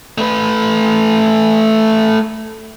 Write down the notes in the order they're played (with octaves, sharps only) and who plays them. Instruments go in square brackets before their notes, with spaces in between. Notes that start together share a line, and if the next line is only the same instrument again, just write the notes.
[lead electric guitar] A3 B4